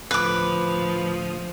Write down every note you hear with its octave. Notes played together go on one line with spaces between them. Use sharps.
D2 A2 F3 B4 D6 D#6